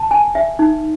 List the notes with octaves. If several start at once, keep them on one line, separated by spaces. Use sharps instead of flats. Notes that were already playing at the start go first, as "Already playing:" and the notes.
Already playing: A5
G#5
E5
D#4